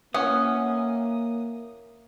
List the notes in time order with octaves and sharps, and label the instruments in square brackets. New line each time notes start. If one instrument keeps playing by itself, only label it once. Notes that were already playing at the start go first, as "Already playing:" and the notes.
[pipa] E3 F#5 [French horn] A#3 [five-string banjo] C#4 [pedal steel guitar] D#6